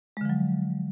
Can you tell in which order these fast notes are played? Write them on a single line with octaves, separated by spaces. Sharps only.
G#3 D3 F3 F#3